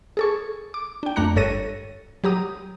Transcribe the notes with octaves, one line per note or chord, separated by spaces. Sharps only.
G#4 A4 C#6
D6
D4 G5
F2 A3 D4 A#5 F#6 C#7
G1 G2 A4 C#5 A#6 D#7
F#3 G4 A#5 D#6